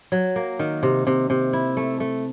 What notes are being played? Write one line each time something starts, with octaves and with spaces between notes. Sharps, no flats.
F#3
A#3
D#3
C3
C3
C3
E4
A3
A3